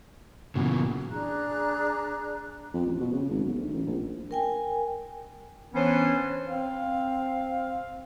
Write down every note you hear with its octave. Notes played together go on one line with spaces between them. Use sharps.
A#2 C#3 E3 F#3 B3
D4 G#4 A#5 F#6
F2
A1
B2
C#3
G#1
B1
D2
A1
A#1
A#4 G5 G#5
E3 B3 C#4 D4 C5 C#5
C4 F5